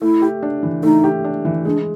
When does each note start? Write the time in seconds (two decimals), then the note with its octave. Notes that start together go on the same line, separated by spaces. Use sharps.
0.02 A3 E4
0.22 G4
0.43 D4
0.63 E3
0.83 A3 D#4
1.04 G4
1.24 D4
1.45 E3
1.65 G#3 D4